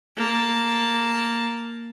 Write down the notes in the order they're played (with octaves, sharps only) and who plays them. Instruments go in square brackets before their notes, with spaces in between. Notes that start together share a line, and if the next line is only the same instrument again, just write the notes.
[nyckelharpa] A#3 A5